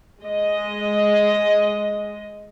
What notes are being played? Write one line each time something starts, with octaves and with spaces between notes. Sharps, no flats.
G#3 D#5